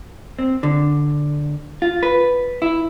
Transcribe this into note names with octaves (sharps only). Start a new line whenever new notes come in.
C4
D3
F4
B4
E4